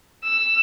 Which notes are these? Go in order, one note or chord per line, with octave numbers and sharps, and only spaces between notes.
E6